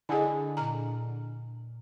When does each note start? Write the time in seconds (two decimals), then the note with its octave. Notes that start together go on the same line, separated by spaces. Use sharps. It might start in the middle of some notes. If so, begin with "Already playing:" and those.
0.09 D3 E4 G#4 D#5 G#5
0.57 A#2 A#5 F6